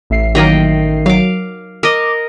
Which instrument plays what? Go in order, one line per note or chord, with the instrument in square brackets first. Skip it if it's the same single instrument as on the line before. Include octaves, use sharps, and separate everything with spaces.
[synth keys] A1 E5 C7
[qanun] D#3 D#5 G5 [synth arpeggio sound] F#3 A#3
[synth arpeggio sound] F#3 [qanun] F5 D6
[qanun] A#4 D#5 [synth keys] D6 [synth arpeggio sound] D#6